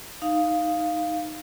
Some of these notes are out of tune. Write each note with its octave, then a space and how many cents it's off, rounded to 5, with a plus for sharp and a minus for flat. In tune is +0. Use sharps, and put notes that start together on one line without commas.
D#4 +0 F5 +0